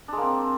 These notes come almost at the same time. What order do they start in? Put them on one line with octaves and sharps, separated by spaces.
D4 G#3 A#3 C4